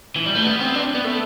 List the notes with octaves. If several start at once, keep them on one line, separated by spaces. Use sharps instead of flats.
E3
G3
A3
B3
C4
D4
B3
A3